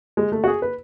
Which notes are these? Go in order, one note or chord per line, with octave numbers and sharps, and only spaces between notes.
G#3
A3
F#4
G#4
B4